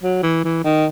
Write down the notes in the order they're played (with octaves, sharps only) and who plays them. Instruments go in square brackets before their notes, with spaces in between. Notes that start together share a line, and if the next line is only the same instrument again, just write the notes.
[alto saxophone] F#3
E3
E3
D#3